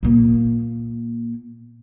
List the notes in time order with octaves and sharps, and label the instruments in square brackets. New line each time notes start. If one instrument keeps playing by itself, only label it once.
[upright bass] A#2 A#3